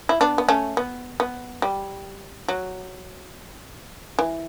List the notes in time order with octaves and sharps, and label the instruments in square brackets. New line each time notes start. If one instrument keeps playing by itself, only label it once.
[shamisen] E4
B3 D4
B3
A3 C#4
B3
B3
G3
F#3
E3